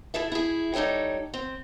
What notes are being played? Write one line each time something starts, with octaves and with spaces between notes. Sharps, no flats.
E4 G#4 A4 E5
E4 G#4
G3 D#4 A4 C#5 G5
C4